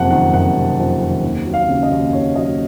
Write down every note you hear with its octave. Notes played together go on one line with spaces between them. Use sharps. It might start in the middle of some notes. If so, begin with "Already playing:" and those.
Already playing: F#1 F2 C3 F#5 A5
D#3 F#5
F#1 F#5
C3
F2
D#3
D#2
F#3
F5
C#3
D#5
D#2
D#2 C#5
F#3 D#5